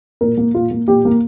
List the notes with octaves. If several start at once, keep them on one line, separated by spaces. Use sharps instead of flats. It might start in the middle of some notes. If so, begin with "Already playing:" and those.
A#2 A#4
A#3
A#2 F4
A#3
A#2 G4
A#3